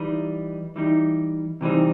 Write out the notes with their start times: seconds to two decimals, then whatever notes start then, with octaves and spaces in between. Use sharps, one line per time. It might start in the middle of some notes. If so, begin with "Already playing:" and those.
Already playing: E3 G3 D#4
0.76 E3 G3 D#4
1.61 C3 E3 G3 C4 D#4